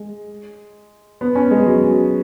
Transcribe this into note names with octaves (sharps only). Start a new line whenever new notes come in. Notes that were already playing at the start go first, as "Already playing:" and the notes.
Already playing: G#3
B3
C#4
G#3
F#3